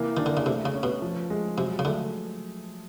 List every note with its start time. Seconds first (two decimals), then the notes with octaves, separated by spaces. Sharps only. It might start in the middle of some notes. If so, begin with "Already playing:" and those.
Already playing: C3 E3 A#3
0.17 D#3 D4
0.26 D3
0.37 C#3
0.46 C3 A3
0.65 C#3
0.74 C#4
0.83 B2
1.02 F3
1.30 G#3
1.58 C3 F#3
1.79 C#3
1.85 D3 A3